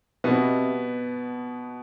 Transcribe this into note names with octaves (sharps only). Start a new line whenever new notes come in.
B2 B3 C4 G4 B4 E5